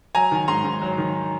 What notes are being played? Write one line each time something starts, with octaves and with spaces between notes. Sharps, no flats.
F#3 G#5 A#5
D#3
G#2 A#5 C6
G#2
F#3
D#3